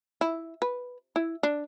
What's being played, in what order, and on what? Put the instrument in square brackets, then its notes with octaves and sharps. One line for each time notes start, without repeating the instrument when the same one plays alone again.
[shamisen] E4
B4
E4
D4